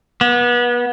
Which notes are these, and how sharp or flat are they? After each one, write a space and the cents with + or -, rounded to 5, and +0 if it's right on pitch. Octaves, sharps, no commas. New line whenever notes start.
B3 -30